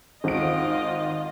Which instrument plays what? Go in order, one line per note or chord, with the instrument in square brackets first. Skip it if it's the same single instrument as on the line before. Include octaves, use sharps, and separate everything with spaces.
[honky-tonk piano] G#1 D7 [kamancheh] F4 D#5